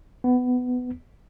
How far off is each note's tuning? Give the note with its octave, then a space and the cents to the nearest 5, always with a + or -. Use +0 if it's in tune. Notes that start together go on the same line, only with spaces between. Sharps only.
B3 +15